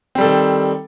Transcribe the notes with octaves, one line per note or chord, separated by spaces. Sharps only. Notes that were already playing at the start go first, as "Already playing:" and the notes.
D#3 G3 C4 A4